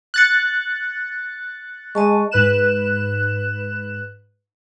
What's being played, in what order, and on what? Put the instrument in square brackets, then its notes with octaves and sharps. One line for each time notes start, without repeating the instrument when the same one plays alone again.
[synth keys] F#6 A6 C#7
[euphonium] G#3 [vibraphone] D#5 A5 C#6
[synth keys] G#2 B4 F#6 E7